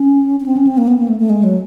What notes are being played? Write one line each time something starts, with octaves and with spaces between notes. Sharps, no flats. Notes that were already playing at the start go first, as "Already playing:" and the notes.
Already playing: C#4
C#4
C4
C#4
C4
A#3
B3
A#3
A3
A3
G#3
F#3